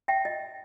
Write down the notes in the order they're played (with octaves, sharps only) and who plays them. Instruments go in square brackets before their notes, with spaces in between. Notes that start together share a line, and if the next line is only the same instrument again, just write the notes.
[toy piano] E5 G5
D#5